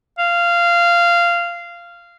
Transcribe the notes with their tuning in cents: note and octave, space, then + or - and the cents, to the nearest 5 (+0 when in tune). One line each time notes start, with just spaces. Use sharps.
F5 -15